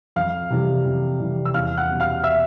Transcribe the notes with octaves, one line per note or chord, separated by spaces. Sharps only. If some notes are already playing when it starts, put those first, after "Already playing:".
F2 F5 F6
C3 E3 G3
F2
C3 E3 G3
E6
E2 F5 F6
F#5 F#6
B2 G3
F5 F6
E5 E6